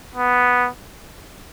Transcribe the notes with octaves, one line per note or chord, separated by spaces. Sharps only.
B3